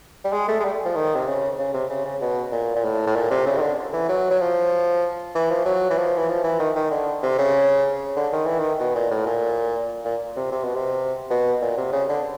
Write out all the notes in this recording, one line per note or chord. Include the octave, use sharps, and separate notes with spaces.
G3
G#3
A3
G#3
G3
F3
D#3
C3
C#3
C#3
C3
C#3
C#3
B2
A#2
A#2
A2
A2
A#2
C3
C#3
D#3
D3
E3
F#3
F#3
F3
E3
F3
F#3
E3
F3
E3
F3
E3
D#3
D#3
D3
C3
C#3
D3
D#3
E3
D#3
B2
A#2
A2
A#2
A#2
C3
C3
B2
C3
B2
A#2
C3
C#3
D3